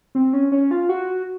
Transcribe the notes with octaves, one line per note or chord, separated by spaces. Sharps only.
C4
C#4
C#4
F4
F#4